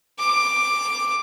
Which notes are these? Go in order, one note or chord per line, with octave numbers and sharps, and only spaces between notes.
D6